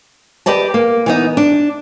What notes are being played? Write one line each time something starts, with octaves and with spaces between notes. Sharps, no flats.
G4 B4 D5 D#5 A5
A#3
E3 B3 D#4
D4